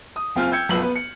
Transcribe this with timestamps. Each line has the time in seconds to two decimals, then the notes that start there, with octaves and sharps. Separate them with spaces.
0.16 D#6
0.36 F#1 C4 F4 G#5 F6
0.51 G5 E6 G6 G#6 C#7
0.69 F#1 B1 F3 B4 E6 F#7
0.82 B3 B4
0.96 C#7